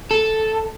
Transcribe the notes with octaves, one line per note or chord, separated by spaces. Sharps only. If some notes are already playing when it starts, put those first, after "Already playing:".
A4